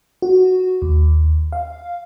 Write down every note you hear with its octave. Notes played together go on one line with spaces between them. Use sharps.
F#4
D#2
F5